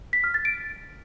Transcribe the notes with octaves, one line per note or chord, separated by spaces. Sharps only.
B6
F6
A6
D7